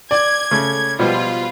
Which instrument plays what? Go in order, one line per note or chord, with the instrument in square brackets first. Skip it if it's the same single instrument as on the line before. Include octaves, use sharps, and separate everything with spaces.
[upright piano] D5 [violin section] G#6
[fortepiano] C#3 A3
[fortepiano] B2 F3 G3 [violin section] F4 B4